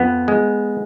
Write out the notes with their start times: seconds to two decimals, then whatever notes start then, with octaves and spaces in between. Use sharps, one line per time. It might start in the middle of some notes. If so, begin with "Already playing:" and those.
Already playing: F2 B3
0.28 G#3